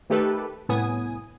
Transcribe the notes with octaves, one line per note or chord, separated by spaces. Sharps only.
D#3 A3 G4 A4 B4
C2 A2 B3 G#5 D#6